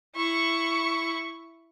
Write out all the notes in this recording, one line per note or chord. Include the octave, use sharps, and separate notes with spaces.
E4 C#6